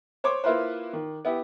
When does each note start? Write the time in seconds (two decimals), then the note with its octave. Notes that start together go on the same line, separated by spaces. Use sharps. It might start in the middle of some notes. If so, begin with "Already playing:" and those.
0.24 C5 C#5 D6
0.44 A#3 E4 F4 B4 C5
0.93 D#3
1.25 B3 E4 G4